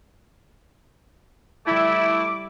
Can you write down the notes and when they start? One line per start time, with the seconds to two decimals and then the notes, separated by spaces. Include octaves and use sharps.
1.67 G3 A3 E4 E5 D6